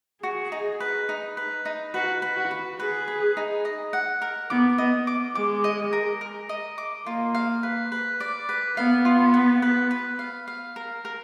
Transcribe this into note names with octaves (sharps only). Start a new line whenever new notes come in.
F#4 G#4
D#4
B4
D#4
B4
D#4
F#4 B4
B4
F#4
B4
G#4 B4
B4
D#4
D#5
F#5
A#4
B3 D6
B3 D#5
D6
G#3 D6
D#5
A#4
A#4
D#5
D6
A#3 F4
F5
B4
B4
D5
B4
B3 F5
F4
B4
B4
B4
F5
F5
A#4
A#4